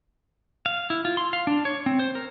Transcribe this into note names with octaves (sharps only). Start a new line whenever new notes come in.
F5
E4
F4
C6
F5
D4
C#5
C4
C5
A#4